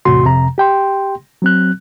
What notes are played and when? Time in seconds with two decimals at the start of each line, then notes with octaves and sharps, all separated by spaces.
0.05 E2 A2 C3 F#4 C6
0.26 F2 C3 A#5
0.58 G4 G5 C6
1.42 F#3 C4 F#6